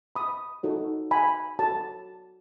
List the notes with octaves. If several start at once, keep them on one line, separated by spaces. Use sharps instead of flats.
B5 D#6
D#4 F#4 A4 C#5
G#5 B5
F#4 A4 C#5 A5